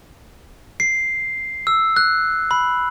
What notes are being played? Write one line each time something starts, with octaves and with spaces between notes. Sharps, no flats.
C7
E6
F#6
B5